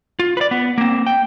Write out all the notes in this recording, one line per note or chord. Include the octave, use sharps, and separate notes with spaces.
F4
B4 D5
B3
A#3 C4
G5